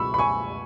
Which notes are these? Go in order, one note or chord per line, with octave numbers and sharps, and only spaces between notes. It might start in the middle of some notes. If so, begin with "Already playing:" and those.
Already playing: C#2 B2 F#3 B5 C#6 E6
B5
G#5 C#6